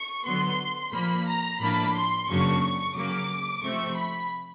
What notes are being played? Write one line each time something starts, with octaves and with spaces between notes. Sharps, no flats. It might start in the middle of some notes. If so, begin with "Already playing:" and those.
Already playing: C#6
D3 F#3 B3 C6
A#2 F3 A#3 B5
A#5
A2 F3 A#3 D4 B5
C6
F#2 C#3 F#3 A#3 D4 C#6
C#6
C#3 F#3 A#3 D6
C3 F3 A3 C4 C#6
B5